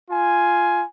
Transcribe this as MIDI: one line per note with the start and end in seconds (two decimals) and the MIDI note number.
0.11 0.84 65
0.11 0.84 80